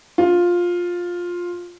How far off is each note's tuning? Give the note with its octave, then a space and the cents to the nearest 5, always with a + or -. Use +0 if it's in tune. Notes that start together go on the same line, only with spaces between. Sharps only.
F4 +10